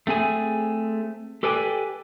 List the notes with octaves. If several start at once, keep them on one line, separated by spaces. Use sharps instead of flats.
A3 C4 G#4 G#5
G4 A4 B4 D5 G5 G#5